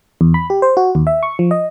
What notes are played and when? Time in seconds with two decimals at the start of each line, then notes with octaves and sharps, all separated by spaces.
0.21 E2
0.34 B5
0.50 G4
0.62 C5
0.77 F#4
0.95 D#2
1.07 E5
1.23 C#6
1.39 F3
1.51 D#5